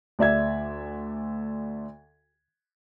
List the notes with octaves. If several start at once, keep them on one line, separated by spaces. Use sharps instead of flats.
D2 D5 E5 G#6